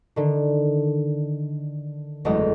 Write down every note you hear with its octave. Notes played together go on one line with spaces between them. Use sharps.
D3 D#3
F#1 E2 G#3 A3 D#5